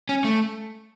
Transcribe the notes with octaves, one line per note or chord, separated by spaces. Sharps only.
C#4
A3